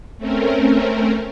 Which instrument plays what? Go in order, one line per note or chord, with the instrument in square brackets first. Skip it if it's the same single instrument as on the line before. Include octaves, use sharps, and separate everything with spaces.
[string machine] A3 C4 C#4 A#4